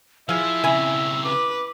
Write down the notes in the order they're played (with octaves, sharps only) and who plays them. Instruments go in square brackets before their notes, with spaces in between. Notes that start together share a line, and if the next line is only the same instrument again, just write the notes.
[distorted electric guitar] F3 [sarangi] E4 [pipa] G#4 F5 [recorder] E6
[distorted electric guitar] C#3 C4 [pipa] E5 G#5 B5
[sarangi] B4 [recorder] D6